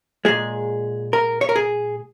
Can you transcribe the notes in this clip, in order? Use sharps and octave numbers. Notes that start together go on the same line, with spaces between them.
A#2 G#3 G#4
A#4
C#5
A#4
G#4